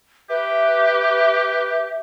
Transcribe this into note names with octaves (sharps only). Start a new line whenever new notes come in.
G4 B4 E5